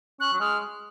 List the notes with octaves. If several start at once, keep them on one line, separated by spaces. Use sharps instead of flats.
C#4 F#6
F#3
G#3 F6